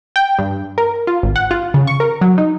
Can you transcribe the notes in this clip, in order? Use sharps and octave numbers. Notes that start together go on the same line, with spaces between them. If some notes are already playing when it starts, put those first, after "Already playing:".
G5
G2
A#4
F4
G#1
F#5
F4
C#3
C#6
A#4
F#3
D#4